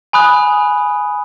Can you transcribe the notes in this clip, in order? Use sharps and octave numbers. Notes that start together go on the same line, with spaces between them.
G#5 B5 D#6 F#6